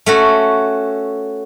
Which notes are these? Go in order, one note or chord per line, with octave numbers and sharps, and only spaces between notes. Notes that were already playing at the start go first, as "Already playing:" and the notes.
A3 C#4 F#4